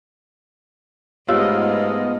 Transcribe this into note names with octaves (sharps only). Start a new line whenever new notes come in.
G#2 A3 B3 F4 G4 C#5 D#5 E6